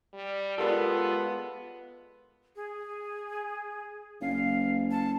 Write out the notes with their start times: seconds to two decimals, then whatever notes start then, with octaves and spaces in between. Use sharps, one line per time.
0.13 G3
0.58 G#3 B3 F4 G4 A4 A#4 D5
2.56 G#4
4.21 F#1 F5
4.91 A5